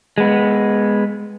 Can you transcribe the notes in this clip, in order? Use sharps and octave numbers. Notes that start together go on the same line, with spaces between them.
G#3 B3